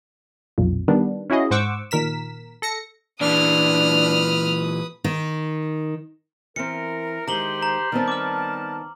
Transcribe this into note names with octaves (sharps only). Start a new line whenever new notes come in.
B1 F2 A#2
D#3 G3 B3 D4
C#4 E4 F#4 G#4 D#5
G#2 C5 F#5 C#6 D6 E6
A#2 D#3 A#4 B6 E7
A4 A#6 C#7
A#2 E3 D4 B4 D#6 F6
D#3
E3 C4 A#4 C#7
D#3 G#3 G4 C5 A#5 F#7 G7
A#5
D#3 G3 B3 C4 A#4 A5
D6 F6